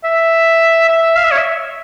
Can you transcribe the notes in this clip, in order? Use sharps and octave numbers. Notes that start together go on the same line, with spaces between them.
E5
E5
F5
E5
C#5
E5